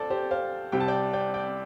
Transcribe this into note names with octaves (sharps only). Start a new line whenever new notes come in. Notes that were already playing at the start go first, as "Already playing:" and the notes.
Already playing: D2 F3 A4 C5 D5
G4 C5
C5 F5
C2 C3 G3 G5
A5
D5 G5
D5 G5
D5 G5